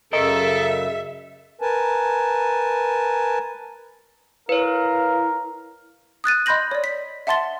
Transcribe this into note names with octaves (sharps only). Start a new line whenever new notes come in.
F#2 C#3 A4 A#4 D#5 E5
A#4 B4 G#5 A5
E4 A#4 B4 C#5 F5
D#6 F#6 A6 D#7
D#5 B5 C6 G6 A#6 F#7
C#5 D5
B6
E5 F#5 A5 C6 A6 G7